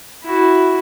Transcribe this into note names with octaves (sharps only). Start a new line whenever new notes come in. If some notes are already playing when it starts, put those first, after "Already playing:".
E4 F#4